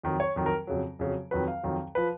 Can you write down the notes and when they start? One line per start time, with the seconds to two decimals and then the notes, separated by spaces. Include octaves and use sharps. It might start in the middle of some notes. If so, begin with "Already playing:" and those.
0.03 F2 D#3 F#3
0.20 C#5
0.36 F2 D#3 F#3
0.46 A#4
0.67 F2 C#3 F#3
0.99 F2 C#3 F#3
1.31 F2 D#3 F#3 B4
1.48 F5
1.63 F2 D#3 F#3
1.95 F3 B4